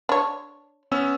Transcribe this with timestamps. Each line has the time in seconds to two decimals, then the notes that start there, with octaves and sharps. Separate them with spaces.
0.09 D4 C#5
0.91 B3 C#4 E6